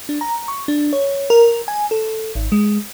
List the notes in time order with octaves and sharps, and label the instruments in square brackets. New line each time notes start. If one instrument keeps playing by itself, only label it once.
[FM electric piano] D4
A#5
C#6
D4
C#5
A#4
G#5
A4
G#1
G#3